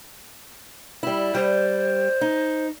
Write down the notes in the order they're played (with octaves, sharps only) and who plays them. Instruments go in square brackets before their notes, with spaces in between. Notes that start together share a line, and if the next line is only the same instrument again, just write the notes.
[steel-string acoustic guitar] G3 E4
[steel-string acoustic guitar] G3 [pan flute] C5
[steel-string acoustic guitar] D#4